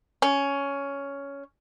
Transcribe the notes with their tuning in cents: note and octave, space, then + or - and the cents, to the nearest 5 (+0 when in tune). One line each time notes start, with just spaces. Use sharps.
C#4 +10